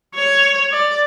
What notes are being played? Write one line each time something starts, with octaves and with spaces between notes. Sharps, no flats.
C#5
D5